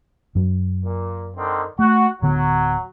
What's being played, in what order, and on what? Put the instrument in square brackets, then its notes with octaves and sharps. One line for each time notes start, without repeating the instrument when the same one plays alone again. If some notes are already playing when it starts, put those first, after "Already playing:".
[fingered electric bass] F#2 F#3
[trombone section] A#2
D3 D#3 C4
[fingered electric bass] A3 [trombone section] F#4
[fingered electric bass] D1 D3 B3 [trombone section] F#3